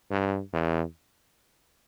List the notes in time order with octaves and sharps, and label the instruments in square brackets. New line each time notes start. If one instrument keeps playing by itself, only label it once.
[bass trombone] G2
E2